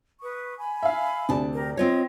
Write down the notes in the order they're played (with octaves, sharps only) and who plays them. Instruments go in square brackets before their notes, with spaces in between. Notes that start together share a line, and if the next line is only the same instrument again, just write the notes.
[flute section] B4 C#6 D#6
G#5 B5
[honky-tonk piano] E5 F5
[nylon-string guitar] D2 A5 [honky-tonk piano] C3 D4
[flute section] G4 A#4
[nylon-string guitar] C4 F4 C#5 [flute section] D#5